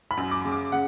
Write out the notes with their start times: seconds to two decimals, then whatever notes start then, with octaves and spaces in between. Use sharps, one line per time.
0.11 B5
0.17 F#2
0.31 D6
0.45 C#3
0.52 D6
0.72 C#3 F#5